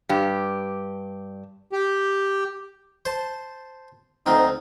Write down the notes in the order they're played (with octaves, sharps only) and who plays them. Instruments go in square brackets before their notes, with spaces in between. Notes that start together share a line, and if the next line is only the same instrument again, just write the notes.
[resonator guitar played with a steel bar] G2 G4
[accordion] G4
[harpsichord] C5 A5
[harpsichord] D2 F3 C4 [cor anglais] D#4